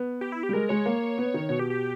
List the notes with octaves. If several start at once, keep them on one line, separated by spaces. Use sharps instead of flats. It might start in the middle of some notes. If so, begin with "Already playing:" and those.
Already playing: B3
G4
E4
G4
G3
G#3 A#4
G#3 C#5
A#3
B3
D#3
B2 C#5
G4
G4